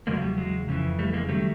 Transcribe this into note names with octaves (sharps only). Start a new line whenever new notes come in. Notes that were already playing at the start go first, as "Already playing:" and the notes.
E2 C#3 F#3 G#3 A#3
G3
F#3 G#3
F2 C#3 E3
G3 A3
G#3 A#3
D#3 F#3 G3 A3